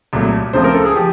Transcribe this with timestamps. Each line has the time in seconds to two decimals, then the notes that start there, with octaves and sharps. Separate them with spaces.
0.13 C2 A#2 F#3 A3
0.53 C#2 C#3 F3 A3 C4 C5
0.64 A#4
0.75 A4
0.85 G#4
0.96 F3 G4